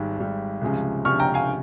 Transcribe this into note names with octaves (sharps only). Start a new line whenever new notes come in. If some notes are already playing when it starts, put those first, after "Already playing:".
Already playing: G#1 G#2 G3
G#1 G#2 G3
C#2 C3 F3 G#3 C#4
C#2 C3 F3 G#3 C#4 C#6 F6
G5 A#5
F5 G#5